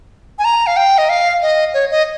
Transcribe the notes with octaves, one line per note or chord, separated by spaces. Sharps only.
G#5
A#5
F5
G5
D#5
F5
D#5
C#5
D#5